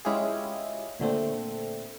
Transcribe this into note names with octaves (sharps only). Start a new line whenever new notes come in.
G#3 C#4 E4 F4 G4 G#4
A#2 D3 A3 C4